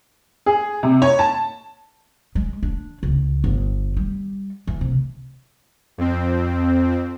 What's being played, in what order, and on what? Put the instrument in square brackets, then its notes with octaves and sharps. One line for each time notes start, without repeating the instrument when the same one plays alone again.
[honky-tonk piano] G#4
C3
C#5
A5
[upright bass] G#3
D4
C#2
G1
G3
E3
C2
[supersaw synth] F2 C4